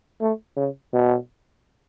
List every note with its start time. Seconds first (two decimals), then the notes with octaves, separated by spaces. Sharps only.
0.21 A3
0.56 C#3
0.93 B2